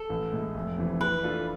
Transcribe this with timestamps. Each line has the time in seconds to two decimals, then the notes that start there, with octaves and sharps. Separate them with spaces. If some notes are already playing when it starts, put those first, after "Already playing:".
Already playing: A4
0.10 A1
0.32 A2 G#3
0.55 F1
0.78 F2 E3
1.00 E3 B4
1.23 A3 D4 F4 A4